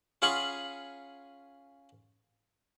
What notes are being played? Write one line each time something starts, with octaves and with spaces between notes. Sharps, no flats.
C#4 F4 G#4 F#5 B5 C#6